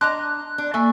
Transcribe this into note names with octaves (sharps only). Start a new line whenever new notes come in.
D4 D#5 A#5 C6 D6 F#6
D4
A#3 A4 E5 G#5 C#6